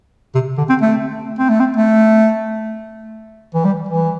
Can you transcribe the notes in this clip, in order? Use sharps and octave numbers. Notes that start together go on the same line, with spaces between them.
C3
D3
C4
A3
C4
A3
C4
A3
E3
G3
E3